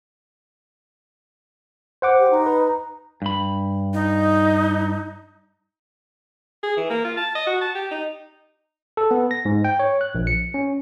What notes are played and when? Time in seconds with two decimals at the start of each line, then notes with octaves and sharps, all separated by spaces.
2.02 C5 F#5 D6
2.19 G4
2.31 D#4
2.46 B4 A#5
3.22 G2 B5
3.93 D#4
6.63 G#4
6.77 E3
6.90 A#3
7.05 F4
7.17 A5
7.35 D#5
7.47 F#4
7.61 A5
7.75 G4
7.91 D#4
8.97 A4
9.11 B3
9.31 A#6
9.45 G#2
9.64 G5
9.80 C#5
10.01 F#6
10.15 A#1
10.27 C#7
10.54 C#4